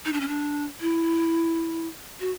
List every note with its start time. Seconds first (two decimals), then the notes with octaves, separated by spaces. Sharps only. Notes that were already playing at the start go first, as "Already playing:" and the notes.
0.05 D#4
0.13 D4
0.21 C#4
0.28 D4
0.81 E4
2.20 F#4